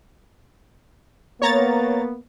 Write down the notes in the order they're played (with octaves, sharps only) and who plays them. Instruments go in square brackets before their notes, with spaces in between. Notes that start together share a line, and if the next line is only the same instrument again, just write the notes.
[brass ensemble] A#3 B3 [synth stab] C#5 A#5 A6